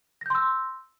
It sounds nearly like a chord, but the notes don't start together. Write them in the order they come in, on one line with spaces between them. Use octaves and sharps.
A#6 G6 C6 E6